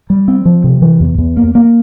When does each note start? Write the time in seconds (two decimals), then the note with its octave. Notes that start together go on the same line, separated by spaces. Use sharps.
0.10 G3
0.28 C4
0.45 F3
0.64 C3
0.82 E3
1.00 E2
1.18 E2
1.37 A#3
1.55 A#3